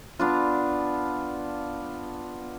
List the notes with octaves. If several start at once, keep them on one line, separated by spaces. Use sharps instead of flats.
B3 D4 F4